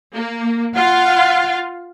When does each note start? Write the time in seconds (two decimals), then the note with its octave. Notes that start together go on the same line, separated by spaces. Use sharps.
0.13 A#3
0.75 F4 F5 F#5